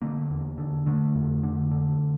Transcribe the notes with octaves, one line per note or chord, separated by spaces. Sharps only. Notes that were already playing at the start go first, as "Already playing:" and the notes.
D3 A#3
E2
D3
D3 A3
F2
D3
D3